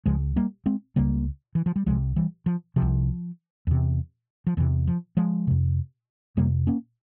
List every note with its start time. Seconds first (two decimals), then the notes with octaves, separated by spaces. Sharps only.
0.06 C#2 C#3 F3 G#3
0.36 G3 A#3
0.66 G#3 C4
0.96 C#2 C#3 G3 A#3
1.55 E3
1.66 F3
1.76 G3
1.86 C2 C3 F3 G#3
2.16 E3 G3
2.46 F3
2.76 C3 F3
2.82 C2
3.67 E2 C3
4.47 F3
4.57 E2 C3 E3
4.87 F3
5.17 F3 G#3
5.47 F2 C3
6.37 F2 C3 G3 A#3
6.67 A#3 C#4